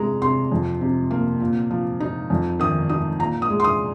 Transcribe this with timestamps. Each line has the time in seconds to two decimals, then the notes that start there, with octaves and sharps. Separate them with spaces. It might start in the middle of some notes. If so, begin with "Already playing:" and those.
Already playing: C3 G#3 A#5
0.22 C3 C6
0.52 F2
0.81 C3
1.11 A#3
1.40 A#2
1.71 F3
2.00 D#4
2.30 F2
2.59 D#3 D#6
2.89 D#4 D#6
3.19 A#2 A#5
3.42 D#6
3.50 G#3
3.60 C6
3.64 D#6